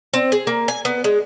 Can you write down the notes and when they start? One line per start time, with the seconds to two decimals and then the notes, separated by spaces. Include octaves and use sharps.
0.14 C4
0.32 G#4
0.47 A#3
0.68 G#5
0.85 B3
1.04 G#3